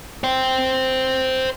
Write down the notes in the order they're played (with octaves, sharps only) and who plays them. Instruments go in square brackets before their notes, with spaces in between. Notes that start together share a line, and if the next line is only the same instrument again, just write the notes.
[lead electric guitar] C5 G5